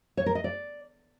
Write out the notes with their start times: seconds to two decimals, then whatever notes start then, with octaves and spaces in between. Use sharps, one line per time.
0.17 C#5
0.26 A#4
0.35 D#5
0.44 D5